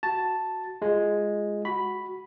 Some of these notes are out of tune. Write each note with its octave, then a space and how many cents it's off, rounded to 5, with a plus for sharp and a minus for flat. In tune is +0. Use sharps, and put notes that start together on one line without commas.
F#4 +0 A5 +0
G#3 +0 F4 +0
F#4 +0 B5 +0